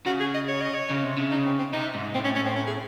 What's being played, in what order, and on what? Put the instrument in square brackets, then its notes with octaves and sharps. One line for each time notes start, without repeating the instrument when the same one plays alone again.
[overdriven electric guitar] C#3 [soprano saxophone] F#4
[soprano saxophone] G#4
D#5
C#5
D#5
C#5
[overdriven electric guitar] C#3
C3
C#3
[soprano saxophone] D#4
C4
C4
[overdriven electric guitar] C3 [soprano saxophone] D#4
[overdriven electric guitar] G#2
[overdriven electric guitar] A2 [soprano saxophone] C4
[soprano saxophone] C#4
C#4
C4
C#4
G#4